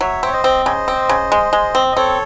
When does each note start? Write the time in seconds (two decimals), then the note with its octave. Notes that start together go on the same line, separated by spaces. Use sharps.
0.01 F#3 C#5 E5
0.23 C4 C#5
0.33 C5 D#5
0.44 C4
0.66 C#3 C5 D#5
0.88 C4
1.09 C#3
1.32 G#3
1.53 G#3
1.75 C4
1.92 D#5
1.97 C4 A4 C#5